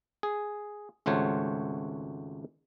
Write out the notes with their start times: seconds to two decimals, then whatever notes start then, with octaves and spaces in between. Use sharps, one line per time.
0.23 G#4
1.06 G#1 C#2 A3 F#4 C5 C#5